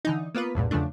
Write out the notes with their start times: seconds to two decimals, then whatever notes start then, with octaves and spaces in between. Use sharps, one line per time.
0.05 D3 E3 D#4
0.35 A#3 B3 F4 B4
0.55 A1 E2 G2 A#2
0.71 E2 C#3 F3 A3 D4